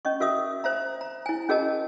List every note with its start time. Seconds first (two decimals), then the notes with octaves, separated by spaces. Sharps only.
0.05 C#4 D#5 C#6
0.20 F#4 A#4 E5 D#6
0.64 C5 E5 A#5
1.01 A#5
1.26 E4 G#5
1.49 C#4 F#4 G#4 A#4 D#5 A5